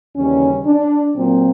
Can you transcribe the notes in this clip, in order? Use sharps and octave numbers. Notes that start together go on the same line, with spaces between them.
D#2 C#3 E3 G3 C#4
D4
A#2 F#3 A#3 C4